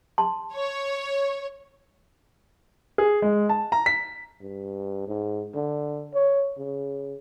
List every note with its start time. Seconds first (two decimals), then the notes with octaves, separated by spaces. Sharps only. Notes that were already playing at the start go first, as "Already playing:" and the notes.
0.18 A5 C6
0.53 C#5
2.98 G#4
3.22 G#3
3.49 A5
3.72 A#5
3.86 B6
4.41 G2
5.08 G#2
5.55 D3
6.14 C#5
6.58 C#3